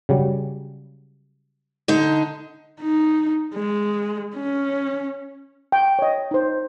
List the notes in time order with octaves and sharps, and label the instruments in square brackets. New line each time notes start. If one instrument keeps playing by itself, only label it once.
[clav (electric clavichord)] C#3 F#3 G3
[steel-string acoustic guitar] D3 D#4
[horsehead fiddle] D#4
G#3
C#4
[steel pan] G5
C#5 D#5
D#4 C5